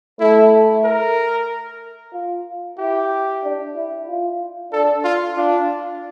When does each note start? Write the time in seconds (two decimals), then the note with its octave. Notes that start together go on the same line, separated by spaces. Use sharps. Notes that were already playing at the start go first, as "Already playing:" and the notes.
0.20 A3 E4
0.84 A#4
2.14 F4
2.78 E4 G4
3.44 D4
3.76 E4
4.08 F4
4.72 D4 A4
5.04 F4
5.36 D4 F4